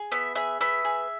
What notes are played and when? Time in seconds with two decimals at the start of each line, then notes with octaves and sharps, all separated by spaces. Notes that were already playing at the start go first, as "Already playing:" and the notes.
Already playing: G#4
0.12 B3 E5
0.35 G#4 E5
0.61 B3 E5
0.85 G#4